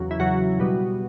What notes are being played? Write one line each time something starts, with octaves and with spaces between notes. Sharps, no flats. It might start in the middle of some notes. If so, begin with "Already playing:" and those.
Already playing: E2 C#3 F#3
E4
E2 C#3 F#3 F#4
B2 G3 B3